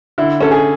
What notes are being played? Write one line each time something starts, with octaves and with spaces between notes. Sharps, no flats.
D3 E4
C#4 A4
G#4